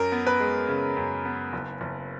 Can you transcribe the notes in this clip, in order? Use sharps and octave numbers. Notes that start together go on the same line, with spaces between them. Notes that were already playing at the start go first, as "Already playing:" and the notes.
Already playing: F#2 A#4
B3
B4
G#3
C#3
F#2
B3
F#1
F#1